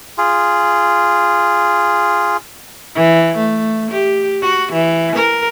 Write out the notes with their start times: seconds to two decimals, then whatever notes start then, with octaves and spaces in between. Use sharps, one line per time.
0.18 F4 G#4
2.96 E3
3.37 A3
3.91 G4
4.42 F#4
4.72 E3
5.16 A#4